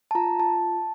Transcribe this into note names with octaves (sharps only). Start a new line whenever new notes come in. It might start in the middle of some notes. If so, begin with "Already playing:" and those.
A5
F4 A#5
F4 A5